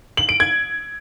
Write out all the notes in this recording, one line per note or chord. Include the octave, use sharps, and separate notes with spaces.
F#7
D7
G#6